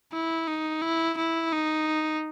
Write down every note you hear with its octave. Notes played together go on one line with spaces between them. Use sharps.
E4
D#4
E4
E4
D#4